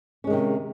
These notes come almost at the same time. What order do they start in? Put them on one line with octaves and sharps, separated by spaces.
C#4 G#3 D#3 C3